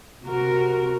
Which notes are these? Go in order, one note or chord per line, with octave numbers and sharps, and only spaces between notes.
C3 F#4 A#4